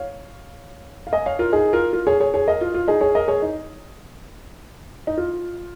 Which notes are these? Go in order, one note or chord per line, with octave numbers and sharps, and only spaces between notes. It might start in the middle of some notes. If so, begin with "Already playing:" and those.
Already playing: C#5 F5
F5
D#5 G#5
C#5 F5
F4 A#4
D#4 G#4
F4 A#4
F4 A#4
G#4 C#5
G#4 C#5
G#4 C#5
A#4 D#5
F4
F4
D#4 G#4
G#4 C#5
A#4 D#5
G#4 C#5
D#4
D#4
F4